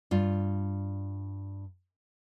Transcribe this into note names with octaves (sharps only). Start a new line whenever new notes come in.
G2 F4